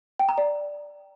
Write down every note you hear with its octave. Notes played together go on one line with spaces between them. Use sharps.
G5
A#5
D5